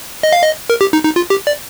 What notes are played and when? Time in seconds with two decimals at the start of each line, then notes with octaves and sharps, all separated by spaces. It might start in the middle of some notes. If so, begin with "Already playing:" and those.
0.23 D#5
0.32 F5
0.43 D#5
0.70 A#4
0.81 G4
0.93 D#4
1.05 D#4
1.16 F4
1.30 G4
1.47 D5